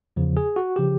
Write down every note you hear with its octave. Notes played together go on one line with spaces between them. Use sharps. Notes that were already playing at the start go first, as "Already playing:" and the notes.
E2 C#3 F3
G#4
F#4
C#3 F3 G4